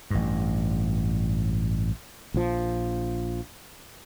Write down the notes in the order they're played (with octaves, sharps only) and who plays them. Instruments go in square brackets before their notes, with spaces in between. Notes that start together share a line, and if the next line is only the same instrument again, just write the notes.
[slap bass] A1 G2
[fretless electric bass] A#1 F3